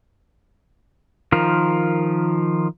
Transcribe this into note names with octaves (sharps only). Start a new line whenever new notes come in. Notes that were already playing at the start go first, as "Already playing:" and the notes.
D#3 F3 F4 A#4